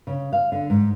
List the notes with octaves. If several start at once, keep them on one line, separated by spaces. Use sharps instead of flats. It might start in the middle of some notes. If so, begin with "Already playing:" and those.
C#3
F5
D3
G#2